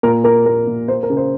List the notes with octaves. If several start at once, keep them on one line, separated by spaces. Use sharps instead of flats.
A#2 A#4
A#3 A#4
A#3 A#4
A#2
A#3 C5
A#4
C#3
C5